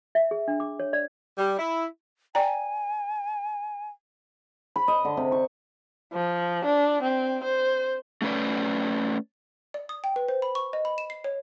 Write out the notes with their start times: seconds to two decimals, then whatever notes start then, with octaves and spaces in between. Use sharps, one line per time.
0.15 E5
0.31 G#4
0.48 D4
0.60 D6
0.80 C#5
0.93 D5
1.37 G3
1.58 E4
2.35 D5 G5 G#5 A#5
4.76 B5
4.88 D#5
5.05 D3
5.17 C3
5.32 C#6
6.13 F3
6.65 D4
7.03 C4
7.44 C5
8.22 A3 C#4 B4 D5
9.74 D5
9.89 D#6
10.04 G5
10.16 B4
10.29 C5
10.42 B5
10.55 C#6
10.73 D#5
10.85 B5
10.98 E7
11.10 C7
11.24 C#5